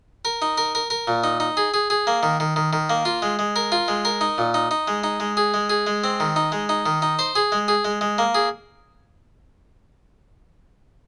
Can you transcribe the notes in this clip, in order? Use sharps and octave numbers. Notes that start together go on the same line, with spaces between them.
A#4
D#4
A#4
A#4
A#4
A#2
D#4
D#4
G#4
G#4
G#4
A#3
D#3
D#3
D#3
D#3
A#3
F4
G#3
G#3
A#4
F4
G#3
A#4
D#4
A#2
D#4
D#4
G#3
D#4
G#3
G#4
G#3
G#4
G#3
C4
D#3
D#4
G#3
D#4
D#3
D#4
C5
G#4
G#3
G#4
G#3
G#3
A#3
G#4